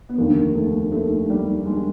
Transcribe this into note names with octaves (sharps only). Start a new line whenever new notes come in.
B3
F1 D#2 D3 A#3
A3
A#3
A3
G3
G#3